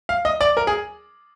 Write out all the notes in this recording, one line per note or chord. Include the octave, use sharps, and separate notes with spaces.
F5
D#5
D5
A#4
G#4